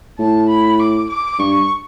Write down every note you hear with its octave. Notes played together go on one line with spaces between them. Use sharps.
A2 A5
B5
D6
D6
G2 C#6